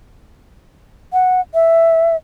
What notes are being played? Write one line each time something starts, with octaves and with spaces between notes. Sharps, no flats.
F#5
E5